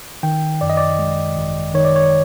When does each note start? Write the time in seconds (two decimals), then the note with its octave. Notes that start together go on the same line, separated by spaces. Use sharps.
0.23 D#3 G5
0.61 F#2 D5
0.70 D#5
0.77 D5
0.99 G#3
1.37 G#1
1.74 D#3 C#5
1.85 D5
1.96 C#5